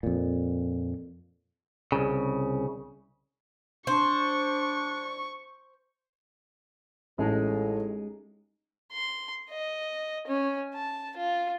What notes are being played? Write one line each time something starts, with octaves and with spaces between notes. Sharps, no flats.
F2 A#2
C2 C#3
D4 C5 C#6
A1 A2 G#3 D#4 A5
C6
D#5
C#4
A5
F4